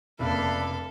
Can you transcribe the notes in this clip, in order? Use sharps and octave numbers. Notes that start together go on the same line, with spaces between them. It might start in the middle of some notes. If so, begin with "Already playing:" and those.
F1 C#3 A#3 D4 A4 E5 F5 B5